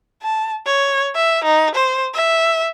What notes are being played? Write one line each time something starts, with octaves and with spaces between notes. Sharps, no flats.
A5
C#5
E5
D#4
C5
E5